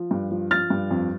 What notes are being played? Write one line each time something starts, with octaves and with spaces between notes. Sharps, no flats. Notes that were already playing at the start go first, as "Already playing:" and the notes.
Already playing: F3
G2
F3
F3 F6 A6
G2
F2